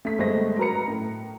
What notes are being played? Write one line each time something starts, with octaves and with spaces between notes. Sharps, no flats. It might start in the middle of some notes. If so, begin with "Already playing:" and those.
A3 B6
G1 G#3 A3 C5 A#6
F#3 A#4 B4 A#5 C#7
A2